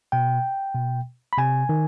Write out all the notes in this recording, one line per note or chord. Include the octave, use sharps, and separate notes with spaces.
B2 G5
B2
B5
C3 G#5
D#3